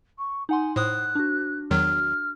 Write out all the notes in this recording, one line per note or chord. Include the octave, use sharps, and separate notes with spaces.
C#6
D#4 F#5 G#5 C6
A2 C5 D#6 F#6
D4 F#4
E2 D#3 F#3 F6